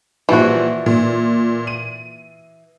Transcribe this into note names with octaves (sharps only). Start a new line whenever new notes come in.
A#2 E3 F3 G3 F#4
A#2
D#7